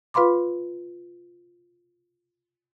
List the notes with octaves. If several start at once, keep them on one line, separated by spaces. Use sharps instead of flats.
F4 B4 F5 B5 C6 D6